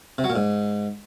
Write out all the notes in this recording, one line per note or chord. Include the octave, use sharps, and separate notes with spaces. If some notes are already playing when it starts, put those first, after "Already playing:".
C3
F#3
A#2
G#2